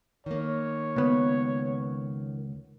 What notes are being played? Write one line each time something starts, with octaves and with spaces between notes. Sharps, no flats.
D#3 A#3 C#5
C#2 B3